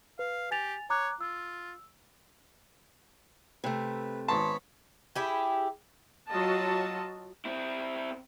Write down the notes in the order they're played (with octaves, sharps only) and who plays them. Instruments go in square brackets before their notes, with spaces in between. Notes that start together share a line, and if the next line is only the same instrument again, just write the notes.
[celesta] B4 [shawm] F5
[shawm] G4 [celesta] G#5 A6 F7
[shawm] C#5 [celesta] A#5 D6 F#6
[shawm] F4 [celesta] E6
[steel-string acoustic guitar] C3 A3 [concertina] B4
[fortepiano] G#1 A5 [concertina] B3 C#5 B5 [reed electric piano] C6
[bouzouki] E4 G4 G#4
[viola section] F#3 F4 F#4 D#5 A5
[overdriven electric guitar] C4 E4